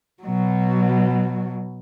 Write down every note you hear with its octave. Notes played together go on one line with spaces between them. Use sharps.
B2 F#3